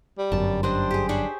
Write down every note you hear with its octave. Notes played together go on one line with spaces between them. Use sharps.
G3
G1 F#2 A5
G3 D4 C5 D#5
G4 G#4
D4 C5 C#5 B5